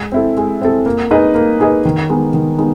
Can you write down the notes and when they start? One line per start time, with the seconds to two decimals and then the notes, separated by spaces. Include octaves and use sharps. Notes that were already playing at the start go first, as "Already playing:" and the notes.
Already playing: G#3
0.12 C4 E4 A4
0.37 G#3
0.61 C4 E4 A4
0.86 A#3
1.11 D#4 G#4 B4 D#5
1.35 A#3
1.60 D#4 G#4 B4 D#5
1.85 D#3
2.09 G#3 B3 D#4
2.34 D#3
2.58 G#3 B3 D#4